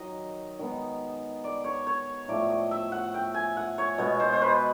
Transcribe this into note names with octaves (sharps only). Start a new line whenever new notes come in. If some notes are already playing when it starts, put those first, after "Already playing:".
Already playing: D#3 F#3 D#5
D#3 G#3 B3
D5
C#5
C#5
A2 F3 A3 D5
D#5
E5
F#5
G5
G#5
F#5
C#5
B2 G#3 B3 C#5
C5
C5
B4